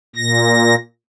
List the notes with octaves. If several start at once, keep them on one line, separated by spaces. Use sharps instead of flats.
A#2 A#6